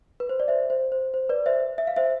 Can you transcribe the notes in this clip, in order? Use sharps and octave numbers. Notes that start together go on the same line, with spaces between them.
B4
C5
D5
C5 E5
C5
C5
C5
B4 D5
C5 E5
E5
F5
C5 E5